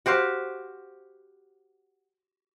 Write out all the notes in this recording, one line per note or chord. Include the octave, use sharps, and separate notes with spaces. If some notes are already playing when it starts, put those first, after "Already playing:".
F#4 G4 C5 F5